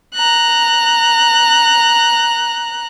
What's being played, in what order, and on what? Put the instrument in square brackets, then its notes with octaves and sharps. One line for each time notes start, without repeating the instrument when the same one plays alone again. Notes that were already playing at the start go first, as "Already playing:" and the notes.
[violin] A#5 F#6